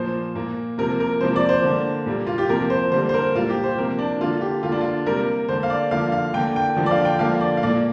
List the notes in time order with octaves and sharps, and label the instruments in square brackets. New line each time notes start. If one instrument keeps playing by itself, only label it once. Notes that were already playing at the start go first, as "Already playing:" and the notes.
Already playing: [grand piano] A#2 F3 A#3 C5
A#2 A#3
C3 F3 A#3 A#4
A#4
C3 F3 A#3 C5
D5
C5
D3 A#3
A#2 G3 A#3
F4
G4
C3 F3 A#3 A#4
C5
D3 G3 A#3 C5
C5
A#4
A#2 G3 A#3 F4
G4
C5
C3 F3 A#3 A#4
D4
D3 A#3 F4
G4
D3 A#3 F4
D4
F4
C3 G3 A#3 A#4
D3 A#3 C5
F5
D5
D3 F3 A#3 F5
F5
D3 G5
A#3
G5
D3 F3 A#3
D5
F5
G5
D3 F3 A#3 F5
D5
F5
A#2 D5
A#3